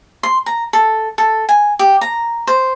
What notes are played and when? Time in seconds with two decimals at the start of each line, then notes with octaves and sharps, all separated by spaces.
0.23 C6
0.46 A#5
0.73 A4
1.18 A4
1.49 G#5
1.79 G4
2.01 A#5
2.47 C5